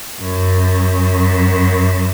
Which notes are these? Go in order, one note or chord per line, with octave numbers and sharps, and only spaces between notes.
F#2